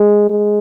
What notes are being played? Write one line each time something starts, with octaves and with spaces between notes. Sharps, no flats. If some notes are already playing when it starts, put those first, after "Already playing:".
Already playing: G#3
G#3